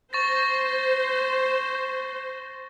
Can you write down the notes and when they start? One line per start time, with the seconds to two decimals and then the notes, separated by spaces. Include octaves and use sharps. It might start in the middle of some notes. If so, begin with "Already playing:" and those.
0.13 C5 C#6 A6 A#6